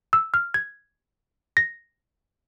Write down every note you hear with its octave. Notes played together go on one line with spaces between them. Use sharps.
E6
F6
G#6
A#6